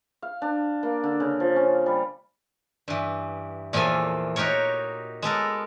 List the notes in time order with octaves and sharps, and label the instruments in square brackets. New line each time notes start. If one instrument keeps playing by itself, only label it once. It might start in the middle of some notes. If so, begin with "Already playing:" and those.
[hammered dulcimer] F5
D4
A#3
D3
C#3
F3
C#4
G3
[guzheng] G2 E3
E2 A#2 E3 F3 A4 G#5
D#4 F#4 G4 A#4 C#5
G#3 B3 A4 A#4